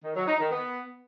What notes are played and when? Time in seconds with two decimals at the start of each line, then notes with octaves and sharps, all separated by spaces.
0.04 D#3
0.16 F#3
0.28 D#4
0.39 D#3
0.51 B3